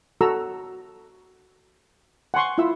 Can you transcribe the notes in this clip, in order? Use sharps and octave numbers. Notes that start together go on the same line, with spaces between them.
F#4 A4 A#5 E6
F#5 G#5 C6 C#6
E4 F4 E5 E6